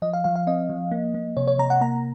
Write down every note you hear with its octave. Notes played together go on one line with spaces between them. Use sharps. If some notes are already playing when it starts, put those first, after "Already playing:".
F3 D#5
F5
F3 F5
F5
C4 D#5
F3
A#3
A#3
C3 C#5
C#5
C3 A#5
F#5
A#3 A#5